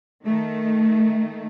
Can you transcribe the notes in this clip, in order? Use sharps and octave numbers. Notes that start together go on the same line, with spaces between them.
D#3 A3